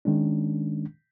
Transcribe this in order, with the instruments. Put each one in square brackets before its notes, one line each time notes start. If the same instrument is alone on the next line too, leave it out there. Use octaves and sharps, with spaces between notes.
[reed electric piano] D#3 G#3 C#4 D4